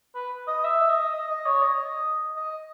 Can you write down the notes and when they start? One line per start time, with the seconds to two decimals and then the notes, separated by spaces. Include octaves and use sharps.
0.15 B4
0.48 D#5
0.64 E5
0.90 D#5
1.14 D#5
1.30 D#5
1.46 C#5
1.63 D#5
2.36 D#5